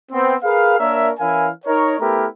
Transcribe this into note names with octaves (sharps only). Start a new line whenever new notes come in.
B3 C4
G#4 A#4 B4 F5
A#3 D4 A#4 C#5 E5
E3 C#4 E4 A#4 F5 G#5
D#4 A#4 C#5
A3 B3 E4 G4 A#4